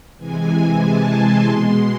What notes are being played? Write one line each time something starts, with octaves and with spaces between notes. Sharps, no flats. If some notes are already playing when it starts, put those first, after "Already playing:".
C3 E3 G#3 G#5
A5
C6
B2 G#3